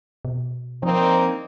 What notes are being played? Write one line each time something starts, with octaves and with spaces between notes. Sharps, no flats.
B2
F3 A#3 C4 D4 D#4